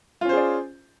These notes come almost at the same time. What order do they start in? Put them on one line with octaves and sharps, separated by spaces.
F4 C#4 C5 G#4 D5